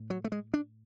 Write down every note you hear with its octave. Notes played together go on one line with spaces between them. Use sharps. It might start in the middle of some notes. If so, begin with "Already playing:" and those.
Already playing: A2
F#3
A3
G#3
D4